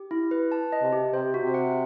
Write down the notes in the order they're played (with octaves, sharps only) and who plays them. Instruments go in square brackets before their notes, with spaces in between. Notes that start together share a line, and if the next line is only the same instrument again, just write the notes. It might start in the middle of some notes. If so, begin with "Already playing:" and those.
Already playing: [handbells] G4
E4
B4
A5
D#5
[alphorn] C3
[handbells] G4
[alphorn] C3 [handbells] C5
[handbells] F#4
[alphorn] C3
[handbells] F#5